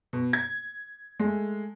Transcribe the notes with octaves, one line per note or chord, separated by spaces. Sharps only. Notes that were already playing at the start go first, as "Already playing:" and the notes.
B2
G#6
G#3 A3